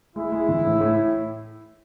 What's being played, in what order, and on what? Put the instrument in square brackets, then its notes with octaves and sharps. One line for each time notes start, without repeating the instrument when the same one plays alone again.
[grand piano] G#3 [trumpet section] E4
[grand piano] G#3
E3
A2
A2